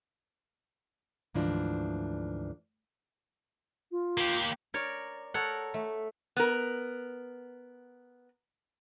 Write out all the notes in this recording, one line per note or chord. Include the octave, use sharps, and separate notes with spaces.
D2 G#2 E3 F3 D4
F4
A#3 G4
A#4 C#5 D5
A4 A#4 C#5 F#5
A3
B3 A#4